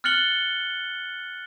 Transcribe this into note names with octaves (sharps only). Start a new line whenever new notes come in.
F6 F#6 A6 C#7 F#7 G7